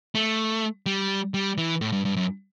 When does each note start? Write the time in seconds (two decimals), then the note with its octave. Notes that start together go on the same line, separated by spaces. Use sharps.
0.15 A3
0.86 G3
1.34 G3
1.58 E3
1.81 A2
1.93 G2
2.05 G2
2.16 F#2